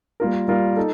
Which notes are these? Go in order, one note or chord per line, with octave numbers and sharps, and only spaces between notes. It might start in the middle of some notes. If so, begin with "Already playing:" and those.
G3 A#3 F4 A#4
G3 A#3 F4 A#4
D#4 A4